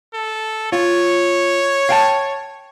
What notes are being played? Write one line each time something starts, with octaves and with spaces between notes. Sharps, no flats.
A4
F4 C#5
F5 G5 A5